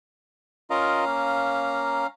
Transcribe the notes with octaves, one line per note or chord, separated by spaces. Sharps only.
C#4 F4 A#4 D#5 F5 A#5
A#3